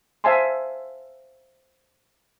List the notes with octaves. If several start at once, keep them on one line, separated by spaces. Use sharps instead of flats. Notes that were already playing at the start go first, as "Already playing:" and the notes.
C5 E5 F5 G#5 A5 C6